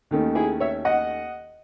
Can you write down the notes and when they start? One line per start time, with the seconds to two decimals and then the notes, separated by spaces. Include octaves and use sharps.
0.11 D#2 D#3 A3 C#4
0.35 E4 G#4
0.60 C#5 E5
0.85 D#5 F#5